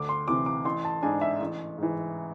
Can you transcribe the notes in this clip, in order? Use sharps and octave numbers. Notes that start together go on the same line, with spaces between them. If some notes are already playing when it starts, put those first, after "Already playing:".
Already playing: D2 D6
C6
C3 E3 D6
D6
A1 C6
A5
G#2 G#3 D4 G#5
E5
A1
G#2 E3